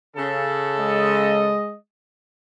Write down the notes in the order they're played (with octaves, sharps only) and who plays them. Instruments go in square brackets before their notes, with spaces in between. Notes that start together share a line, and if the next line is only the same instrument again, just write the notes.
[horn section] C#3 A4
[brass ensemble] G#3 D#5